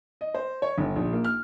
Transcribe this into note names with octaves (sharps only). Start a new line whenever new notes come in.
D#5
C5
C#5
G1
A#1
A#3
F6